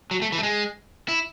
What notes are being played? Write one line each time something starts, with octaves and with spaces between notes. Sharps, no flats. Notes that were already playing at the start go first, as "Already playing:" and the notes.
F#3
A3
E3
A3
G#3
E4